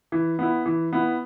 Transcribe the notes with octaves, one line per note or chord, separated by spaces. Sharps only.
E3
B3 E4
E3
B3 E4